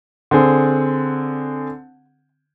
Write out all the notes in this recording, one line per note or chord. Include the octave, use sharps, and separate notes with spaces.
D3 C4 G#4